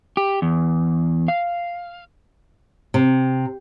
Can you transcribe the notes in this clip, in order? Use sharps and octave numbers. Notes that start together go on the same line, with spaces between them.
G4
E2
F5
C3